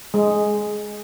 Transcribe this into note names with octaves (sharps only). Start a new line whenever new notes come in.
G#3